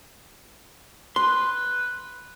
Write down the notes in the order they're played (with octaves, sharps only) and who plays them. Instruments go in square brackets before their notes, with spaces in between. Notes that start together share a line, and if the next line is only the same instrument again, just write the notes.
[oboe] B4 [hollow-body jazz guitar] C6